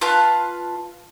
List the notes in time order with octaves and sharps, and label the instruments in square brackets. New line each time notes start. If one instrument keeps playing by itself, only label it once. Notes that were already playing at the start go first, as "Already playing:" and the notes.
[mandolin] F4 B4 F5 A5